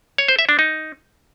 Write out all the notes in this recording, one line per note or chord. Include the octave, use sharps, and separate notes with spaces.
C#5
C5
E5
D4
D#4